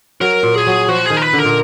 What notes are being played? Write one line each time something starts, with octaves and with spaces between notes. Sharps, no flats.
F#3 A#4
A#2
G#4
F#3
F3 F#4
D#3 G#4
A#4
B4
D3
A#4
A#2